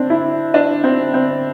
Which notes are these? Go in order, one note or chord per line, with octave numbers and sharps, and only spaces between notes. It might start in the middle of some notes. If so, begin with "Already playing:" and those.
Already playing: C4 D4
E4
D4
C4
C4